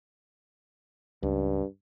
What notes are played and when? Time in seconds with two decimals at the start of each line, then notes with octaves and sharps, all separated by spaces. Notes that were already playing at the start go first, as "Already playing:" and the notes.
1.23 C#2 G2